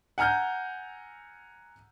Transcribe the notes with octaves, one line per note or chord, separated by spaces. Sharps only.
F#5 G#5 A#5 F6 G6